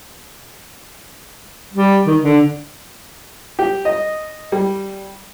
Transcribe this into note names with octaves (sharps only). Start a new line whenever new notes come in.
G3
D#3
D3
G4
D#5
G3